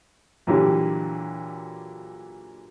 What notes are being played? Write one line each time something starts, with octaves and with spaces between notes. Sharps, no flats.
A#2 D3 E3 F#3 G3